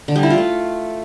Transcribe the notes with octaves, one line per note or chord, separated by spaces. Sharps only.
D3
G3
E4
F4
A3